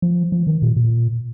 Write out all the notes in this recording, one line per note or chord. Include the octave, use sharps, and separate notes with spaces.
F3
F3
D#3
A#2
A#2